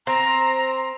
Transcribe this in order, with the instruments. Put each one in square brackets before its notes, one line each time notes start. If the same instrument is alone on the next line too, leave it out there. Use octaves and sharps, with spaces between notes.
[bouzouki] C4 [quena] A#5